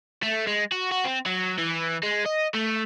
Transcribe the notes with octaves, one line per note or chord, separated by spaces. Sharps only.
A3
G#3
F#4
F#4
C4
F#3
E3
G#3
D#5
A3